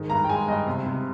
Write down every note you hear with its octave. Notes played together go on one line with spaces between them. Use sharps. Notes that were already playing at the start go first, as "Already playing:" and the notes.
Already playing: G#2 D#3
G2 A#5
G5
G#3 G#5
G2 D#5
C3
C3